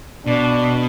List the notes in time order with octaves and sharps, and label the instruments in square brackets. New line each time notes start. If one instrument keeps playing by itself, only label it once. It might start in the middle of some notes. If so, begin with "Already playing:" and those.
[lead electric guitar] B2 [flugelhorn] D4